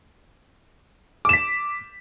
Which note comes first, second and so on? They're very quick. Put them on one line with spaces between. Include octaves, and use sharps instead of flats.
D6 E7 B6